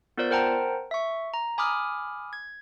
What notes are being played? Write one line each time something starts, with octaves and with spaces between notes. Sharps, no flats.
B3 F4 A#4 C5 D5 G6
A#4 C5 F#5 G5 A5 A#5
E5 C#6
A#5
G#5 B5 D6 D#6 F6
G#6